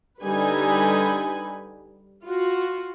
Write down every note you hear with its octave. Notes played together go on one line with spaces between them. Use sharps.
D3 G3 D#4 B4 G#5 B5
F4 F#4